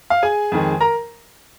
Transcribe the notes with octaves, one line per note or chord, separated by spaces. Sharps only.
F5
G#4 G#5
F2 D#3 G#3
A#4 A#5